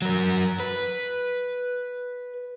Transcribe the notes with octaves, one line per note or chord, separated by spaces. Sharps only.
F#3 A#4
B4